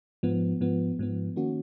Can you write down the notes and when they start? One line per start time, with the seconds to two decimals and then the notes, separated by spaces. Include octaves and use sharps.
0.23 G#2 F3 B3
0.61 G#2 F3 B3
0.99 G#2 F3 B3
1.36 D#3 A#3 C#4 F#4